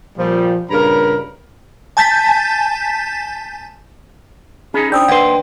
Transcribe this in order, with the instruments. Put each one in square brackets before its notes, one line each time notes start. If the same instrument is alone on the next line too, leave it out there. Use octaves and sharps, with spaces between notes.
[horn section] A#2 F3 G3
G2 A#2 C#3 A#4 A#5 B5
[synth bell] G#5 A5 G6 A6 B6
[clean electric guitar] C#4 D#4 [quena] G#4 [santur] B5
[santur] D4 C5 [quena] G5 [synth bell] D#6 E6 G6
[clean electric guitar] D#2 C6 [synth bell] B4 F#5